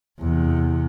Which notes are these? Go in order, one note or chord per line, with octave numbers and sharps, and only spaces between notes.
E2 C3